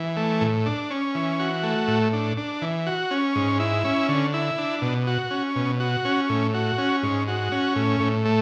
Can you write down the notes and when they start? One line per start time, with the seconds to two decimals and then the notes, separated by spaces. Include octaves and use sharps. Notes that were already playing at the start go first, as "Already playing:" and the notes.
Already playing: E3
0.17 A3
0.41 A2
0.66 D4
0.90 C#4
1.15 E3
1.39 F#4
1.63 A3
1.88 A2
2.13 D4
2.38 D4
2.62 E3
2.87 F#4
3.11 C#4
3.36 G#2
3.59 E4
3.85 C#4
4.09 D3
4.34 E4
4.58 D4
4.82 B2
5.07 F#4
5.31 C#4
5.56 B2
5.80 F#4
6.05 C#4
6.29 A2
6.54 F#4
6.78 C#4
7.03 G#2
7.28 F#4
7.52 C#4
7.76 A2
8.00 A2
8.25 A3